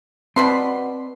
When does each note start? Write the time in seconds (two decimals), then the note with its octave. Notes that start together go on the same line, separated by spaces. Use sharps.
0.36 B2 C4 B4 D5 B5 C6